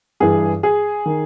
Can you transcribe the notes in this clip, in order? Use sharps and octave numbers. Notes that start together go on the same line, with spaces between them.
G2 E3 G#4
G#4
D#3